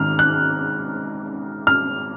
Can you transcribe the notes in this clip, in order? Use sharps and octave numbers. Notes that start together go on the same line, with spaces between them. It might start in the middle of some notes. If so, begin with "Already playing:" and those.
Already playing: G#2 D#3 G#3 F6
F#6
F6